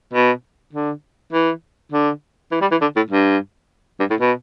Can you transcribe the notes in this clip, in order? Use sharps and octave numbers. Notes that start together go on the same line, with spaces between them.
B2
D3
E3
D3
E3
G3
E3
D3
A2
G2
G2
A2
B2